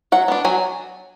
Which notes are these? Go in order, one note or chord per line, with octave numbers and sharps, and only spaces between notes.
F#3 F#5
B3 D4
F#3 G#5